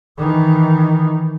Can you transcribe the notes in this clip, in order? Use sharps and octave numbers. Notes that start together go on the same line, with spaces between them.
D#3 E3